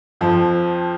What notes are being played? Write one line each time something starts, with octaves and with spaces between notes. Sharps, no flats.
F2 F3